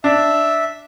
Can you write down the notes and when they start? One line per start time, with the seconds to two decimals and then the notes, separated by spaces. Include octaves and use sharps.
0.04 D4 E5